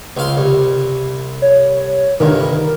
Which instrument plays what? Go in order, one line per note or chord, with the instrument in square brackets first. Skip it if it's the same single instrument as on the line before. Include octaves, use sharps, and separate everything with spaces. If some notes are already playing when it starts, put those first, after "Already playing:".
[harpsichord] C#2 F5 C6
C2
[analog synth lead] C#5
[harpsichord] C2 G2 [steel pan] D3 D#3 [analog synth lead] A#4